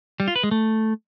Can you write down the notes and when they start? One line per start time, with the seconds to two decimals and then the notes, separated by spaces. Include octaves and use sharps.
0.20 G3
0.28 F4
0.36 B4
0.43 G#3
0.51 A3